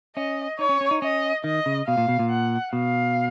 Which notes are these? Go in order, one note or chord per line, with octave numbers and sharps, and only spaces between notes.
C#4 D#5
D#4 C#5
C#4
C#4
D#4
C#4 D#5
D#3 D#5
C#3
B2 F5
A#2
B2
A#2
F#5
B2 F5